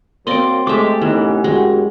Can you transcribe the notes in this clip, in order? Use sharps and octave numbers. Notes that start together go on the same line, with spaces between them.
F#3 A#3 C4 D5 D#5 C6 D7
G#3 A3 G4 E5 D6
C2 A2 E3 B3 C#4 D#4
F#2 G#3 F#4